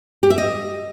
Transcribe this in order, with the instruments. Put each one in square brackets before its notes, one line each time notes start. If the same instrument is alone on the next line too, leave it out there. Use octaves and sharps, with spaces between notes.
[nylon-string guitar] G4
E5
D#5